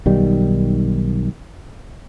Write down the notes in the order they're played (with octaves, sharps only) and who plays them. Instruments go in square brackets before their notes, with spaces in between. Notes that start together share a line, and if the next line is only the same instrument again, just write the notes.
[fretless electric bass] B1 D#3 G3